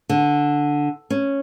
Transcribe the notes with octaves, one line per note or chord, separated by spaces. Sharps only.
D3
C#4